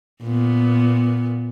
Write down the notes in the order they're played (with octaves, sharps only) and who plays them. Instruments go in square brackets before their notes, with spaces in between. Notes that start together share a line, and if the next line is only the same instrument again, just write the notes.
[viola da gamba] A#2 B3